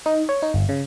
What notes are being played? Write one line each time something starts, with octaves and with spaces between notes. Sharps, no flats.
D#4
C#5
D#4
G1
C#3